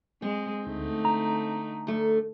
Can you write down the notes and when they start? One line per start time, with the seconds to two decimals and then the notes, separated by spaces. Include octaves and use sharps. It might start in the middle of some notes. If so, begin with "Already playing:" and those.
0.22 G#3 C4
0.66 D2 D3 A3 D#4
1.05 A#5
1.87 D2 A3